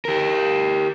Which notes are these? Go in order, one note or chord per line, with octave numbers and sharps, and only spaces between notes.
G4 A#4